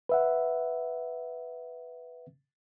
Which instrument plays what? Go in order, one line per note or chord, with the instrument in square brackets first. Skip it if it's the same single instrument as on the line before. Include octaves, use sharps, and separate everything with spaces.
[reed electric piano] B4 E5 F#5